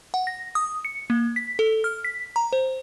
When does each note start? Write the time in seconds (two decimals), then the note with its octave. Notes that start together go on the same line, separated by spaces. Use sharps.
0.14 F#5
0.27 A#6
0.55 D#6
0.85 C#7
1.10 A#3
1.36 B6
1.59 A4
1.84 F6
2.05 B6
2.36 A#5
2.53 C5